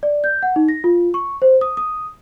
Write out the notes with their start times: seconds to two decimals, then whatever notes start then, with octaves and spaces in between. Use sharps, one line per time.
0.03 D5
0.24 G6
0.43 F#5
0.56 D#4
0.69 A#6
0.84 F4
1.14 C#6
1.42 C5
1.61 D#6
1.77 D#6